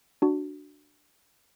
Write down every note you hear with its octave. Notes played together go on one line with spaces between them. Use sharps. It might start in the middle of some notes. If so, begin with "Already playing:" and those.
D4 F#4